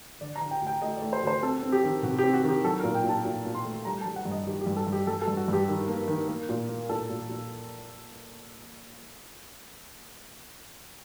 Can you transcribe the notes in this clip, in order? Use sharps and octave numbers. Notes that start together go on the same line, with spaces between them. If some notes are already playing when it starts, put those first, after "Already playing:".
D3 D5
A#5
D3
G5
D2
G5
A3 D#5
D5
A3
C5
D2 C5
C4 A4
C4
G4
D#3
C3 F#4
G4
C4
F#4
D#3 G4
F#3 A4
A#4
A#2
G5
A#2
A5
A#2
A#2
C6
A3
G3 A#5
A5
G3
F#5
G2
D#5
D#3 G4
G4
G2
A4
G2
G4
G2 A4
A4
G2
F#4
G2 G4
D#3
A#3
D#3
A#3
A#2
A#3
A#2 A4
A#2
A#2